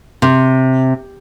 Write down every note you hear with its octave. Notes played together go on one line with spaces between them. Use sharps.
C3